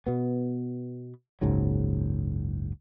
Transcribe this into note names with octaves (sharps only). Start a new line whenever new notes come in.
B2 B3
F#1 C#2 G#2 F#3